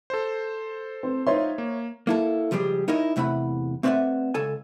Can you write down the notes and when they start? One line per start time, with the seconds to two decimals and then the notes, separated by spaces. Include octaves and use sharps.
0.10 A4 C5
1.03 C4
1.27 D#4 F4 C5 C#5 E5 C6
1.58 A#3
2.07 A#3 E4 A4
2.51 C#2 F3 G3 G4 G#4
2.88 D#4 E4 A#4 C#5 D#5
3.16 E2 C3 A3 E4 F#5 B5
3.83 A3 C4 B4 D5 E5 F#5
4.34 C#2 A4 G#5